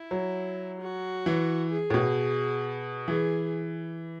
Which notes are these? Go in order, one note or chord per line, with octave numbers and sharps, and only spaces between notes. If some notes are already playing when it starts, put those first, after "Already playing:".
Already playing: E4
F#3
F#4
E3
G#4
A2
B2
E3 G#4